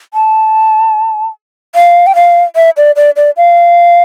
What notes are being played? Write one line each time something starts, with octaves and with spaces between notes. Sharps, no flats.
A5
F5
G5
F5
E5
D5
D5
D5
F5